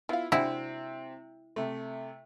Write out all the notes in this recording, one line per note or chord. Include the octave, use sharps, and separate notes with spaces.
B3 E4 F4 F5
C3 G#3 C4 D4 E4 F#4
C3 A3